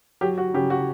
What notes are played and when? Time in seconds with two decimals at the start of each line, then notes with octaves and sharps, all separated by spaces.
0.21 F#3 G4
0.38 F#4
0.54 C#3 G4
0.70 F#4